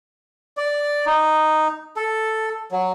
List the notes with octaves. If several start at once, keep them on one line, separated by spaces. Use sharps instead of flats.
D5
D#4
A4
F#3